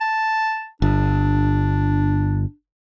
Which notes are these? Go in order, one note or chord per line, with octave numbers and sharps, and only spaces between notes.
A5
G1 D4